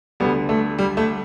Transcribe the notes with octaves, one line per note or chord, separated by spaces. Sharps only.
D2 D3 G3 B3
A3
G3
A3